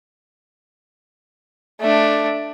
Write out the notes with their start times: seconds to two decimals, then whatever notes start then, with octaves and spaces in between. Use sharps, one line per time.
1.81 A3 D4